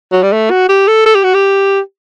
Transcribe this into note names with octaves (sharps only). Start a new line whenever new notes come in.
F#3
G3
A3
F#4
G4
A4
A4
G4
F#4
G4